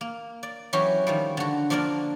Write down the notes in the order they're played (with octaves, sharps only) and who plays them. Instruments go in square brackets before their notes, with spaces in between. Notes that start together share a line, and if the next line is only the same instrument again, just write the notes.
[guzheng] A#3
D5
E3 F#3 C#4 F#4 G4
D#3 F3 G3
D3 F#4
F3 A#3 D4 A#4 D5